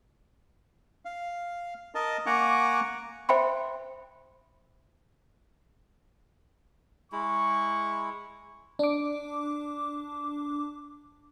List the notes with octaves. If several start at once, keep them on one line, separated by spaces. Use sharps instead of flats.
F5
A#4 D#5 A5
A#3 F#5 G#5 A#5 C#6 D6
C5 E5 G5 B5 C6
G#3 E4 C#6
D4 D6